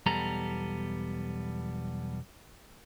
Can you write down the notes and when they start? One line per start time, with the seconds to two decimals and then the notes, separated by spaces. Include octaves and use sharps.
0.06 B1 E2 G3 B3 A4 A#5